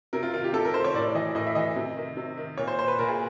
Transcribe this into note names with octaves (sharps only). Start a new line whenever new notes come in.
C3 A#4
F4
D#3 F4
G4
C3 A4
A#4
D#3 C5
C#5
A2 D5
E3 D#5
A2 D#5
E5
E3 D#5
C3
D#3
C3
D#3
A#2 C#5
C5
C5
B4
A#2 A#4
G#4